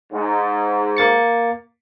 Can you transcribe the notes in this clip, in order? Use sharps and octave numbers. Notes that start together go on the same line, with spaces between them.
G#2
A#3 A6 C#7